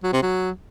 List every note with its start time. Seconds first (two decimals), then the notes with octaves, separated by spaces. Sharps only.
0.03 F#3
0.13 C3
0.23 F#3